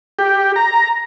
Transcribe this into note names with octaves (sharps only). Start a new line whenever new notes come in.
G4
A#5